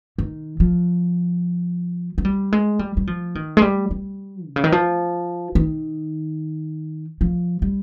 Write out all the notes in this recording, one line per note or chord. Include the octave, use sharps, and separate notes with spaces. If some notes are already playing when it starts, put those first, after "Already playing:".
D#3
F3
G#3
G3
G#3
G3
G3
F3
D#3
G#3
G3
G3
C3
C#3
D#3
F3
D#3
F3
G3